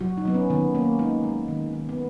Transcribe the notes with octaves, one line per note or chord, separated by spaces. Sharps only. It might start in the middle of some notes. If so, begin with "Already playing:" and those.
F#3 F#4
D#4
F#3 B3
C#4
D#3 B3
A#3 C#4
G#3 D#4
G#3
D#3
D#3
B3